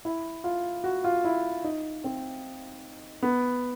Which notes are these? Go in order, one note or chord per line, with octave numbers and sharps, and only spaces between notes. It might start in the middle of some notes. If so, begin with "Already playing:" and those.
E4
F4
F#4
F4
E4
D#4
C4
B3